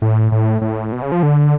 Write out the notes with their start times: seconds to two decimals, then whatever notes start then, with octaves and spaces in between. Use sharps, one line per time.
0.02 A2
0.32 A2
0.61 A2
0.92 B2
1.02 C#3
1.12 F3
1.23 D3